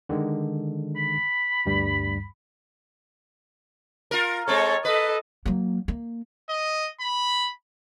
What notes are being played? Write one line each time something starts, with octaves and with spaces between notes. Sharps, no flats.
D3 D#3 G#3
B5
D2 G2 G3
F4 A#4
G#3 C4 A4 C#5
A4 B4 D#5
F#3 A#3
A#3
D#5
B5